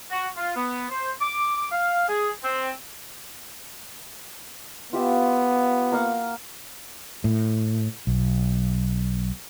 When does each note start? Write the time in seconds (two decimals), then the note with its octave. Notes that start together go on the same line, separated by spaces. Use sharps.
0.11 F#4
0.36 F4
0.56 B3
0.90 C5
1.21 D6
1.72 F5
2.09 G#4
2.44 C4
4.93 B3 F4 G4 E5
5.92 A#3 F5 F#5
7.24 A2
8.07 B1